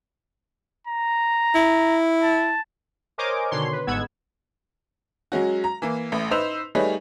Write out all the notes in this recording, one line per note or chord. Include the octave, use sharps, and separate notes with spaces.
A#5
E4
A5
A#4 C5 C#5 D#5 G#5 D6
B2 D3 D#3 C#5 C6
B4
G1 G#2 B3 F#5 E6 G#6
F#3 G#3 C#4 F#4
A#5
E3 A#3
A1 A2
D#4 B4 C5 E6 F7
G3 A3 D#4 G#4 B4 C#5